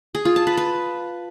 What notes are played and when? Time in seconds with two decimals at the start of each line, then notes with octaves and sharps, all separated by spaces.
0.15 G#4
0.25 F4
0.36 A5
0.47 B4
0.57 B4